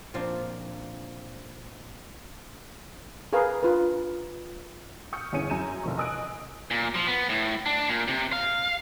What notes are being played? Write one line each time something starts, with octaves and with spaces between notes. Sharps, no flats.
A#2 F3 C4 D4 F4
G#4 A#4 B4 F5
D4 F4 B4
C#6 D#6 F6 G6 C#7
G1 E2 C#4 G#5 C#7 D#7
F#2 G#5 A#5 G6 D#7 E7
F1 F3 C#6
D#5 G#5 D#6 F#6 D7
A#2
F3
B3
A2
D4
A#2
C3
F5